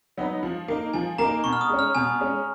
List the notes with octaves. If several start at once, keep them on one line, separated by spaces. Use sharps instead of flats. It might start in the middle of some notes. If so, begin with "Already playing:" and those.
F#3 B3 D#4
F3
A#3 D#4
F3 G#5
A#3 D#4 A#5
B2 C#6
F6
D#6
G#3 C#4
F6
B2 G#5
G#3 C#4